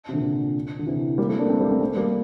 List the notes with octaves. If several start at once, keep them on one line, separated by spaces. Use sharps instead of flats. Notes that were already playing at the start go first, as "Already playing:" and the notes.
C3
A#2 D3
D3
C3 E3
G3 A#3
A3 C4
A#3 D4
A3 C4
G3 A#3
A3 C4
A3 C4
G3 A#3